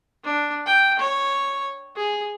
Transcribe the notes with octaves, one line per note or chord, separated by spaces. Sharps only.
D4
G5
C#5
G#4